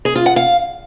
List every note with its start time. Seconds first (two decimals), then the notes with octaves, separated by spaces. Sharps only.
0.05 G#4
0.15 F4
0.26 F#5
0.36 F5